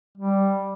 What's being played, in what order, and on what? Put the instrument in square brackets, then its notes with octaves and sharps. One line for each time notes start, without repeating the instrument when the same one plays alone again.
[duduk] G3